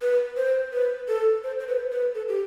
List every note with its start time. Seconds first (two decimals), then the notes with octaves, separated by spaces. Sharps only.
0.02 B4
0.37 C5
0.73 B4
1.08 A4
1.44 C5
1.60 C5
1.68 B4
1.92 B4
2.15 A4
2.28 G4